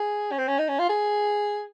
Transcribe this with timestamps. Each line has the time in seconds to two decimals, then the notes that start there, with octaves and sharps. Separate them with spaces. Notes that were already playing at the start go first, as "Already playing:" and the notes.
Already playing: G#4
0.32 C#4
0.38 C4
0.47 C#4
0.59 D#4
0.68 C#4
0.79 F4
0.89 G#4